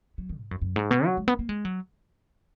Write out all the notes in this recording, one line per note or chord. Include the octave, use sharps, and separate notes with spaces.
F#3
D#3
G#2
F#2
F#2
G#2
B2
F#3
G#3
B3
A#3
G#3
F#3